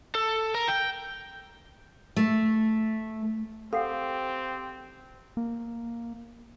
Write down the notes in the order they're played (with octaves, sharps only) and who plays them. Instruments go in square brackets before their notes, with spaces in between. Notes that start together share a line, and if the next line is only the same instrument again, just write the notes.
[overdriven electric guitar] A4
A#4
G5
[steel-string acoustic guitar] A3
[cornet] C4 [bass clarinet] G4 [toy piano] A4 F#5 [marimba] F5
[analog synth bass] A#3